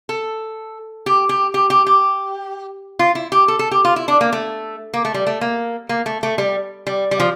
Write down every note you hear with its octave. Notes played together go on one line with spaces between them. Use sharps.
A4
G4
G4
G4
G4
G4
F4
E4
G4
A4
A4
G4
F4
E4
D4
A#3
A3
A#3
A3
G3
A3
A#3
A#3
A3
A3
G3
G3
G3
F3